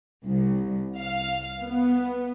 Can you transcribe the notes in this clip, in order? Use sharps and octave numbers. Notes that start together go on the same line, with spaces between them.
C2
F5
B3